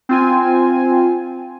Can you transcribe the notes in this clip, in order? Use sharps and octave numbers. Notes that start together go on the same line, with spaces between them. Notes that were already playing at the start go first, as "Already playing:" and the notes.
C4 F4 G#5